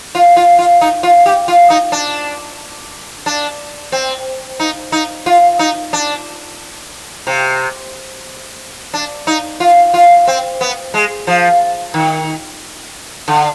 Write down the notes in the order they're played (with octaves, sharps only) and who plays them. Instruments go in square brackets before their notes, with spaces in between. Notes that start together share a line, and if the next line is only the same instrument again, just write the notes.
[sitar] F4
F4
F4
D#4
F4
G4
F4
D#4
D4
D4
C4
D#4
D#4
F4
D#4
D4
C3
D4
D#4
F4
F4
C4
B3
G#3
F3
D#3
D3